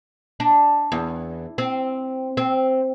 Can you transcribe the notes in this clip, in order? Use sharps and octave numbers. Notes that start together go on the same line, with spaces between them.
D4
E2
C4
C4